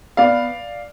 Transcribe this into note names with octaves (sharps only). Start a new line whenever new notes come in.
B3 D5 F5